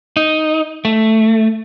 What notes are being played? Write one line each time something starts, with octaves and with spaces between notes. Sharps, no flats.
D#4
A3